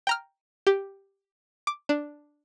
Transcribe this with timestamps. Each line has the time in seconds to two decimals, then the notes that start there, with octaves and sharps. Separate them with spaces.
0.07 G5 A#5 F6
0.67 G4
1.67 D6
1.89 D4